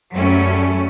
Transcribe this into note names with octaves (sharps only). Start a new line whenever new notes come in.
F#2 F#3 G3 A3 C#4